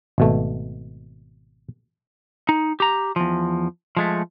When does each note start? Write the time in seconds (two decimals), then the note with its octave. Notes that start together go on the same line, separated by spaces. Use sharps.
0.18 G#1 B2 A3
2.49 D#4
2.80 G4 A#5
3.16 E2 F3
3.97 F3 G#3 A3